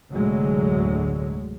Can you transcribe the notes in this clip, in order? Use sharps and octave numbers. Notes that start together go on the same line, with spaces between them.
F1 D2 A2 D3 F#3 G#3